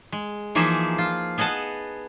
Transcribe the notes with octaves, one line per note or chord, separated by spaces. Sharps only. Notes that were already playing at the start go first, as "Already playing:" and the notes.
G#3
E3 F3 A#3 D#4 G#4 E5
F4
B3 G#4 D#5 F#5 A5